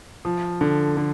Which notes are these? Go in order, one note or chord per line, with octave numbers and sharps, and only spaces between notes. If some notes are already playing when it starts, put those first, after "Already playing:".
F3
D3
D3